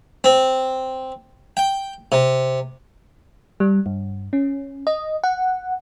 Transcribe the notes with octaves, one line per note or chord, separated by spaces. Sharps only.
C4
G5
C3
G3
G2
C#4
D#5
F#5